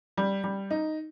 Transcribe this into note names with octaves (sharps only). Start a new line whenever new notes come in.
G3
G3
D#4